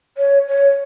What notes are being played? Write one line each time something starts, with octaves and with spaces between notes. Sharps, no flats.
C#5
C#5